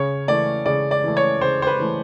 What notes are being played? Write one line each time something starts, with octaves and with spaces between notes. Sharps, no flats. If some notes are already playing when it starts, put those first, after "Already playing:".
Already playing: C#3 C#5
E3 A3 D5
C#3 D5
D5
E3 A3
C#5
C#3 C5
C5
B4
E3 A3